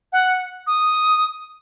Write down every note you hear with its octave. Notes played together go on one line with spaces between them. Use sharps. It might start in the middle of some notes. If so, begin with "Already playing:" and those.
F#5
D#6